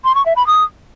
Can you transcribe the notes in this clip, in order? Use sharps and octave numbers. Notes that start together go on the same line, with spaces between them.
C6
C#6
E5
B5
D#6